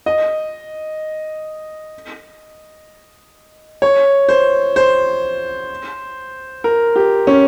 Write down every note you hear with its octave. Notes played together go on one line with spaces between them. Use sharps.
D#5
C#5
C5
C5
A#4
G4
C#4